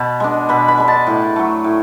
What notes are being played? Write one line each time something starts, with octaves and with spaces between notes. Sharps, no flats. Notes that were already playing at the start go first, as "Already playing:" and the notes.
Already playing: B2 A5 B5
G#3 D4
B2 B5
B5
G#3 D4
A5
A2
F#3 A3
A2